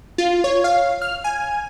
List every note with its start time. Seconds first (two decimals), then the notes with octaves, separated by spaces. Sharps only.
0.18 F4
0.44 C#5
0.64 F5
1.02 F6
1.24 G#5